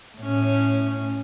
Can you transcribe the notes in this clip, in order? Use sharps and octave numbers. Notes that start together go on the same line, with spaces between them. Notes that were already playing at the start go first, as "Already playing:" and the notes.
A2 C#4